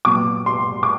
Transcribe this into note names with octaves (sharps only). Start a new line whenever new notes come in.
A#2 F#3 B3 D6
C6
D6